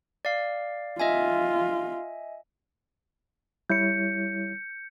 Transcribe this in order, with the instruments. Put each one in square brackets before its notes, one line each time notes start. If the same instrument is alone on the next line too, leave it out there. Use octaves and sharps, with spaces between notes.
[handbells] D5 F5
[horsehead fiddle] F4 [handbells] D#5 E5 G#5
[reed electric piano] G3 E4 C#5 [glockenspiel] G6 C#7